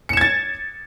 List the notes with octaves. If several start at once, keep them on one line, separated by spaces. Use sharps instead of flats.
G#6 A6 C#7 E7